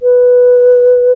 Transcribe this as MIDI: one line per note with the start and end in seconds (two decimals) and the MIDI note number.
0.01 1.12 71